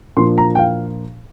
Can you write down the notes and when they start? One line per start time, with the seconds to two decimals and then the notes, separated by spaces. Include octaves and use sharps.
0.17 A#2 F3 A#3 D4 C6
0.38 A#5
0.55 G5
0.59 F5